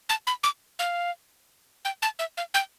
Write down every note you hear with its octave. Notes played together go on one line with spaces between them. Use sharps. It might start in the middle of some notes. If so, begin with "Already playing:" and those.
A5
B5
D6
F5
G5
A5
E5
F5
G5